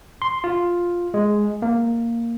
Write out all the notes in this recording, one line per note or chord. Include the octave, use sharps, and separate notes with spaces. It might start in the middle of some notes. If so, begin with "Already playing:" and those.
C6
F4
G#3
A#3